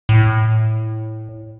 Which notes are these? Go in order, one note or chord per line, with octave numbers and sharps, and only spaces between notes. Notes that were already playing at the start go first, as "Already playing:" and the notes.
A2